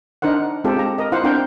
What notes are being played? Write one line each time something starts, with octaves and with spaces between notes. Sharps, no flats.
D4 D#4 A#4 C5 F#5
G#3 C4 F4 G4 A4
A#5
A#4 D#5
E4 F4 C5 F5 F#5
C4 D4 A#4 G5